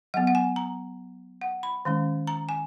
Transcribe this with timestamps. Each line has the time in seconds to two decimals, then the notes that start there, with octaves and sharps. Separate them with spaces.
0.14 F#3 B3 F#5
0.27 F#5
0.35 G#5
0.56 A#5
1.41 F#5
1.63 B5
1.85 D#3 G#3 C#4
2.27 A#5
2.49 G#5